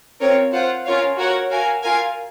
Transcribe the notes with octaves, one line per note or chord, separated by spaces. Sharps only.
C4 F4 A#4 C#5
F4 C5 F#5
C#4 F4 A#4 C#5 F5
F#4 A#4 C#5 F#5
F#4 A#4 F5 G#5
F4 A#4 F5 G#5